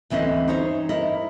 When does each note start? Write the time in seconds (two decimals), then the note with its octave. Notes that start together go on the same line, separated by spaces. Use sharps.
0.10 D2 E3 C4 C#4 D#5
0.48 D#4 C5 C#5
0.89 E4 A#4 D#5